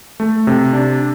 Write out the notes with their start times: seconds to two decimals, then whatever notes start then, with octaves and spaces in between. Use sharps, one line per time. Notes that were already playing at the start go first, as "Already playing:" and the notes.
0.20 A3
0.47 C3
0.73 D4